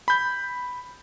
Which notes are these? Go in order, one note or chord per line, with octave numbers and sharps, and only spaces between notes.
B5 G6